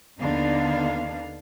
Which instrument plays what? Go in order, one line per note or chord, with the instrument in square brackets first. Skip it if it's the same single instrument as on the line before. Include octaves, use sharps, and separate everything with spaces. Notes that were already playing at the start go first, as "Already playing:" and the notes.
[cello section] D#2 D3 B3 D4 D#4 F5